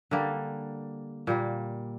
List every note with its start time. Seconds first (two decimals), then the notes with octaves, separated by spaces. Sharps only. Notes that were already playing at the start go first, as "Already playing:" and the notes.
0.11 D3 G3 A#3
1.27 A#2 G3 A#3